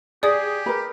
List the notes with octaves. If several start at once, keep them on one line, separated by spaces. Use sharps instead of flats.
G4 G#4 D5 D#6
A#4 B4